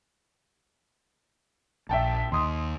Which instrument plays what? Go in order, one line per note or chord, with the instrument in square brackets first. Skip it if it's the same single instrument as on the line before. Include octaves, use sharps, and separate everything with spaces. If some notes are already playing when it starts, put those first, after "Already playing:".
[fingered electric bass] A#1 [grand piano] E5 G5 A5
[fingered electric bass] D#2 [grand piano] C6 D#6